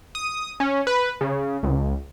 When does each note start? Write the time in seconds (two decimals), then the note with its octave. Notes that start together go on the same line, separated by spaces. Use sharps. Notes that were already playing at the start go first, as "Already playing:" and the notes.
0.15 D#6
0.60 C#4
0.87 B4
1.21 C#3
1.63 C#2